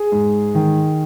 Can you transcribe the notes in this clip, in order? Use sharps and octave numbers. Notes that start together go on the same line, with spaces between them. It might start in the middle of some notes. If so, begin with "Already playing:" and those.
Already playing: G#4
G#2
D#3